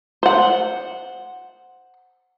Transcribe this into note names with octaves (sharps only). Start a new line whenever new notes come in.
C5 F#5